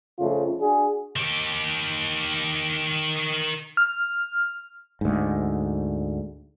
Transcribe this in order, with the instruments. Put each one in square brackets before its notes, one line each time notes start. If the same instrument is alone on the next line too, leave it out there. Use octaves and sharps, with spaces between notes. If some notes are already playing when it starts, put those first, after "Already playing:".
[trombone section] F2 C#3 A3 F4
D4 F#4 G#4
[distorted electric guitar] D#3 G4
[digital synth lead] F6
[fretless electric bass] D2 G#2